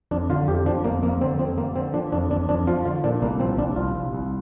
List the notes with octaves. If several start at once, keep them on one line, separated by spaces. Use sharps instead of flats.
F2 D4
D3 F4
F2 G4
F3 D4
F2 A#3
F2 A#3
D3 C4
F2 C4
D3 A#3
D3 C4
F3 D4
F2 D4
F2 D4
F2 D4
F3 F4
D3 F4
A#2 D4
C2 A#3
F3 C4
C2 D4
C2 F4
C2
C2